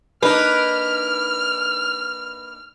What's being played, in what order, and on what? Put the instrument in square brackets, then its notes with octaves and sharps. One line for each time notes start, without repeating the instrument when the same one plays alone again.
[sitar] A#3 D4 D#4 [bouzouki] B4 [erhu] F6